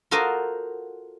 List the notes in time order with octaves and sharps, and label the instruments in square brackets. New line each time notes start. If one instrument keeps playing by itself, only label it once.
[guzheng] F4 F#4 A4 A#4 C5 D#5